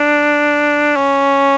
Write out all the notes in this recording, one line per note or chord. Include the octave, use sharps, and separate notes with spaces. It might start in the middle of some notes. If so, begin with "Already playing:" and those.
Already playing: D4
C#4